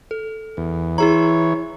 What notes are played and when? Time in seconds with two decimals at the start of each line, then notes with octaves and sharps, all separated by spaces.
0.11 A4
0.57 E2
0.98 E3 E4 G#4 C#5 A#5